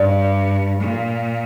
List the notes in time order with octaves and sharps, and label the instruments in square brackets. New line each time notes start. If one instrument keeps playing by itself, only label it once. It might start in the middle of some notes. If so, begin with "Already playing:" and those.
Already playing: [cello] G2 [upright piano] D5
[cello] A#2